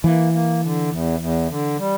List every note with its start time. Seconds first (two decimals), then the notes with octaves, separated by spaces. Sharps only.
0.04 E3 A#3
0.33 A#3
0.62 D3
0.91 E2
1.20 E2
1.49 D3
1.78 G3